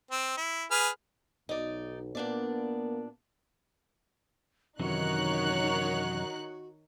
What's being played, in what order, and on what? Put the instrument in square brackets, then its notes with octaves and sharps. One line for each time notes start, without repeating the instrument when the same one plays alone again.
[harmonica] C4
E4
G#4 B4 F6
[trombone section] B1 [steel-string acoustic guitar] D#4 D5
[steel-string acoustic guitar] A#2 D4 D5 [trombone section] A#3 B3
[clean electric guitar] F#2 C3 E3 [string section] D#3 D#4 F#6 [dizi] F#4 [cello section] C#5